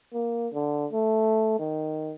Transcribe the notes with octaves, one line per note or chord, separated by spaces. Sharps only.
A#3
D3
A3
D#3